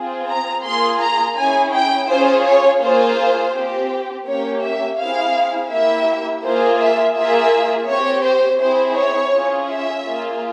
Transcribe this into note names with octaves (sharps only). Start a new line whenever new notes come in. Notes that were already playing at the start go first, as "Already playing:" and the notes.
Already playing: C4 F4 G#4
A#5
A#3 F4 G#4 C6
A#5
C#4 E4 G#4 G#5
G5
C#4 F4 G#4 C5
C#5
A#3 F4 G#4 C5
C4 G4
A#3 C#4 G4 C#5
E5
C4 E4 G#4 F5
A#3 E4 G4 E5
A#3 F4 G#4 C5
E5
A#3 F4 G#4 E5
C4 G4 C#5
C5
C4 E4 G#4 C5
C#5
C#4 F4 G#4
E5
A#3 F4 G#4